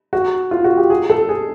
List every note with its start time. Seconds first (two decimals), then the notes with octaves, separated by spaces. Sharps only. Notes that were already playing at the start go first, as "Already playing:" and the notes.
0.13 F#4
0.51 F4
0.64 F#4
0.77 G4
0.90 G#4
1.10 A4
1.29 G#4